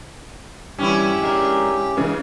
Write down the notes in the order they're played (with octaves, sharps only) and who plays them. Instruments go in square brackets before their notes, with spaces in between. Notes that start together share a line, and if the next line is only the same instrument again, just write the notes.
[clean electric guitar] G2 E3 G3 [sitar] C#4 E4 [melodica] G4
[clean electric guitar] G#3 D4 A#4
[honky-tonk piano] C#3 E3 [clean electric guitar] G#3